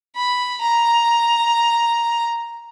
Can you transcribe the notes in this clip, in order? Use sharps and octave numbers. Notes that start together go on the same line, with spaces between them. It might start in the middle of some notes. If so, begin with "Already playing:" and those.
B5
A#5